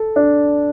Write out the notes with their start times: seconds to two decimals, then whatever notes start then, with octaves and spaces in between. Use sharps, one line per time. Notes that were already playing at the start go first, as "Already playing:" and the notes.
Already playing: A4
0.16 D4